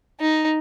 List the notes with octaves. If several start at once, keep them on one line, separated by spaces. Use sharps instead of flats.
D#4